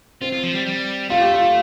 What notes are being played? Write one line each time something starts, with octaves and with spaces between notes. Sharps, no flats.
C4 F4
F4
F3
G3
G3
A3 F4
G4
F4